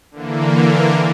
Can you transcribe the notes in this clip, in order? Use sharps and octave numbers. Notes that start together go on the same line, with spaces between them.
D3 E3 A#3